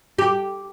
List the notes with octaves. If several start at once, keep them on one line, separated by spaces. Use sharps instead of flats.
G4